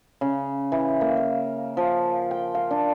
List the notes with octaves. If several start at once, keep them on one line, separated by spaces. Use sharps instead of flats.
C#3
E3
A#3
F5
F3
G5
F5
D4